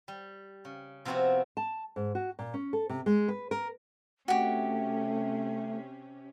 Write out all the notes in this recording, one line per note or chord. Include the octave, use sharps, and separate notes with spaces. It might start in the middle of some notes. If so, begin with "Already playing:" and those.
G3
C#3
C3 F3 B3 C4 E4 F#4
A5
G#2
F#4
A#2
C#4
A4
C3
G#3
B4
A#4
C3 A3 C#4 F#4 G4